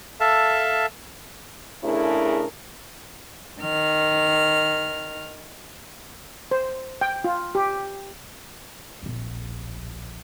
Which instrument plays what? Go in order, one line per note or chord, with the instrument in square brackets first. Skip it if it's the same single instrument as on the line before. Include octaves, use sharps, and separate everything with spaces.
[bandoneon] A4 E5 F5 A5
[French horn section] C#3 A3 D4 E4 G#4 A#4
[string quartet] D#3 F6
[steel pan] C5
G5
F4
G4
[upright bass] D1 A#1